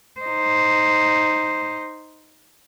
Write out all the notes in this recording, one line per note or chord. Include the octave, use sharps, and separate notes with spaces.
D#4 C5